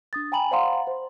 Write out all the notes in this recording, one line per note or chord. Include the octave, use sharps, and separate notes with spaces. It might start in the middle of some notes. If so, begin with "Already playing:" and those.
D4 D#6 A6
G5 G#5 A#5 B5 F#7
C5 D5 F5 F#5 A#5 C6
C5